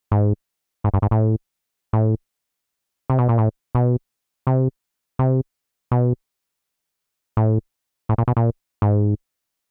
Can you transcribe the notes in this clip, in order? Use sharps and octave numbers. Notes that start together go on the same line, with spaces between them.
G#2
G#2
G2
G#2
A2
A2
C3
B2
A#2
A2
B2
C3
C3
B2
A2
A2
A#2
B2
A#2
G#2